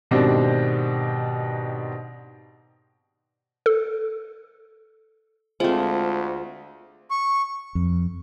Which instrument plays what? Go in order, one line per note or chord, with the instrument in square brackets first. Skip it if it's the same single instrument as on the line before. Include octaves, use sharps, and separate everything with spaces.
[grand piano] G#2 B2 D#3 C4 D4 G4
[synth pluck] A4
[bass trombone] D2 [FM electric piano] G#3 C4 [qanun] A3 F4 [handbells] C5
[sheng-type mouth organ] C#6
[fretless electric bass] F2